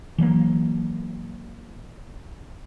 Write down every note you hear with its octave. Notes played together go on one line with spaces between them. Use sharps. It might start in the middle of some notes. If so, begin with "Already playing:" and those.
E3 F#3 G#3 A#3